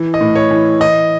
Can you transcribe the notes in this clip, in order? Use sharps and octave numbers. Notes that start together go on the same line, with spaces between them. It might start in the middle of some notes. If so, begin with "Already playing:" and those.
Already playing: E3
D#5
A2
C#5
E3
E3 D#5